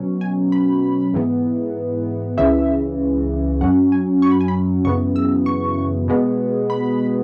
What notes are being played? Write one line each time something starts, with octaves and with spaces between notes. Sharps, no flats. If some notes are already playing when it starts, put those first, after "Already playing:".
Already playing: B2 F#3 C#4
G#5
B5
G#2 E3 B3
C#2 C#3 E3 E5
F#2 F#3 C#4 F#5
G#5
C#6
B5
G#5
B5
F#2 C#3 E3 B3 C#6
E6
C#6
B2 G#3 B3
B5